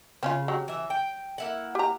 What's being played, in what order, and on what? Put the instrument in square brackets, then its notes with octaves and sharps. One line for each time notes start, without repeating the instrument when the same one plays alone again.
[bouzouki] C#3 [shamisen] C4 C#4 F4
[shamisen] F#3 G4
[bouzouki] E3 E5
G5
A#3 E4 F#5
[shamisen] G4 A#5